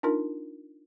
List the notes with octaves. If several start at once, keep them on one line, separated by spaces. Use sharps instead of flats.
D4 D#4 F4 A#4